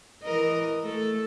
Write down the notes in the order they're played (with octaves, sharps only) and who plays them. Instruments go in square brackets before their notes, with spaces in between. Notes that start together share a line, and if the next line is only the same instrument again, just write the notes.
[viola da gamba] E3 A#4 D#5
A3 A4